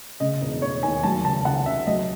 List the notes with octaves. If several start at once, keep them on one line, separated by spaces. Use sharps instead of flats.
C#3 D#5
E1
E1 C#5
D#2 G#5
F#3 A5
C#2 A5
C#2 F#5
C#3 E5
F#3 D#5